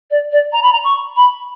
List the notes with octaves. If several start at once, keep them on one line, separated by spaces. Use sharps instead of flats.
D5
D5
A#5
B5
A#5
C#6
B5